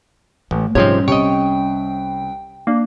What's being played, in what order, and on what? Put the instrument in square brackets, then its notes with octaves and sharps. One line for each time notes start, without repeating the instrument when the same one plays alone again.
[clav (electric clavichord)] A1 [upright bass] A3
[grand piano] G#2 [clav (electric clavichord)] C3 F3 C4 [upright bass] G3 C#4 [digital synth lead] C#5
[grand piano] C2 [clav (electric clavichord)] C#5 D#5 [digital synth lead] G5
[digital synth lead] A#3 [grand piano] D4